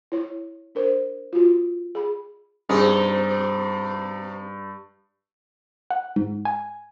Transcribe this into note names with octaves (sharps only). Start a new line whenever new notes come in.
E4 C#5
D4 A#4 C5
F4 F#4
G#4 B5
G2 B2 C4 D#4 G#4
F#5
G#2
G#5